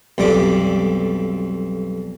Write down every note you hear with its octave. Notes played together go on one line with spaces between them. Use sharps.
B1 F2 G3 D6